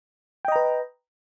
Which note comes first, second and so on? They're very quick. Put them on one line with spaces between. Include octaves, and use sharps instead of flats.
G5 D#5 A#5 B4